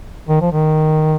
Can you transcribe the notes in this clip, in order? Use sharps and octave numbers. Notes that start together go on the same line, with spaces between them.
D#3
F3
D#3